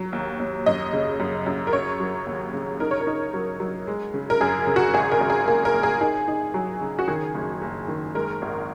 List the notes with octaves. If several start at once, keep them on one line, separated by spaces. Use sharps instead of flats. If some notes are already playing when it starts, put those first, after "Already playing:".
Already playing: F#3
D#2
D#2
F#2 D#5
C#3
F#2
F#2
A#4
C#3 C#5
F#3
D#2
C#3
D#4 A#4
C#5
A#4
D#4
F#3
F#3
G#3
C#3
A#4
F#2 G#4
C#3
F#4
G#1 G#4
A#4
G#1
G#4
A#3 G#4
A#4
A#3
G#4
D#4 G#4
D#4
F#3
C#3
F#4
D#3 G#4
F#1
F#1
D#3
G#3 A#4
G#1